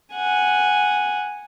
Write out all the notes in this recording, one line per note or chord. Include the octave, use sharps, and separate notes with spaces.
F#5 G#5